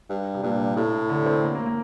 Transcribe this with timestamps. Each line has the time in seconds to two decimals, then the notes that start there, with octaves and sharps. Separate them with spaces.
0.09 G2
0.34 C3
0.43 G2 A#2
0.76 A2 C3
1.10 D3
1.26 C4
1.44 A#3
1.55 A#3
1.66 A#3